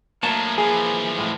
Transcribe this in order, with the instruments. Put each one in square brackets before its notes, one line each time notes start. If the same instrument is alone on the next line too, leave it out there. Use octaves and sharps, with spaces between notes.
[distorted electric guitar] A2 F#3 [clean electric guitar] A#3 A5
[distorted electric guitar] E3 F3 [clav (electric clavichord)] G#4
[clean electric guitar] F2 A2